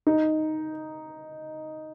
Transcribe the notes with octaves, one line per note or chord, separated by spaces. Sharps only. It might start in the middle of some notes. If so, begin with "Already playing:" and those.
D#4